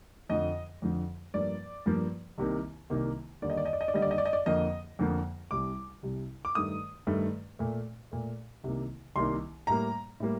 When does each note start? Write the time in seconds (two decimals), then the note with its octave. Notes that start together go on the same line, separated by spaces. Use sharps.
0.29 F2 D3 F3 D#5
0.82 F2 D3 F3
1.34 G2 F3 A#3 D5
1.86 G2 F3 A#3
2.38 C2 C3 D#3 A#3
2.90 C2 C3 D#3 A#3
3.42 D#2 D3 G3 A#3 D5
3.50 D#5
3.57 D5
3.65 D#5
3.73 D5
3.81 D#5
3.88 D5
3.94 D#2 D3 G3 A#3 D#5
4.02 D5
4.11 D#5
4.18 D5
4.26 D#5
4.33 D5
4.46 F2 D3 F3 A#3 D#5
4.99 F2 D3 F3 A#3
5.51 C2 C3 G3 D6
6.03 C2 C3 G3
6.45 D6
6.55 G2 D#3 A3 D#6
7.07 G2 D#3 A3
7.59 A#2 A3
8.12 A#2 A3
8.64 C2 C3 D#3 A#3
9.16 C2 C3 D#3 A#3 C6
9.67 A2 G3 A#3 A#5
10.20 A2 G3 A#3